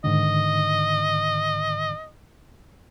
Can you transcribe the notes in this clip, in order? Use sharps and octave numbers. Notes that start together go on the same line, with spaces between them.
G#2 D3 D#3 D#5